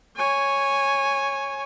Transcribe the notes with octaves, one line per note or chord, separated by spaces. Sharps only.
C#5 G#5